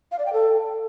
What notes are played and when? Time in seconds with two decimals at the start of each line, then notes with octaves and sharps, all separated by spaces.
0.12 F5
0.19 D5
0.26 G5
0.33 A4